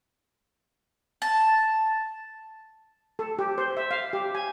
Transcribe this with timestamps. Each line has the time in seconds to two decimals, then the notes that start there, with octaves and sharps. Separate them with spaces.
1.22 A5
3.19 A4
3.39 G4
3.58 C5
3.77 E5
3.91 F5
4.13 G4
4.35 G#5